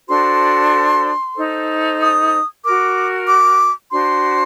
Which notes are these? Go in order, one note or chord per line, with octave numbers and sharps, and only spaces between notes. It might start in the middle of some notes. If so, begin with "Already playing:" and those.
D4 F#4 A4 C5 C6
D#4 A4 C5
D#6
F#4 A#4 D6
D6
D4 F#4 C5 C6